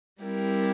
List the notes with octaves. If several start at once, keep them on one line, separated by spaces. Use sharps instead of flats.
G3 C4 E4 G4 A#4